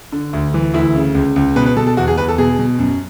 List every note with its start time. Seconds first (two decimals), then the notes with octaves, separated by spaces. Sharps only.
0.12 D3
0.33 D2
0.54 E3
0.74 D2 E4
0.95 C#3
1.15 C#2
1.36 C#2
1.56 B2 B4
1.66 B4
1.77 B2 A4
1.87 A4
1.97 E2 F#4
2.08 G#4
2.17 E2 B4
2.28 A4
2.38 B2 G#4
2.59 B2
2.78 F#2